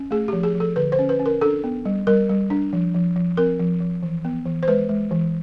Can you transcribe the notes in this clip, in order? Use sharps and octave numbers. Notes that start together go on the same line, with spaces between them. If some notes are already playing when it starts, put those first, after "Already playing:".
Already playing: C#4
A3 G#4
F3 G4
G#4
F3
A4
D3 B4
C5
C#4
B4
C#4
A#4
D4 A4
B3
G3
G3 A#4
G3
D4
F3
F3
F3
C4 A#4
F3
F3
E3
B3
E3
C5
G#3 B4
G#3
E3